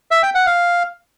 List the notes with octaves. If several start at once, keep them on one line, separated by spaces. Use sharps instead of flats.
E5
G5
F#5
F5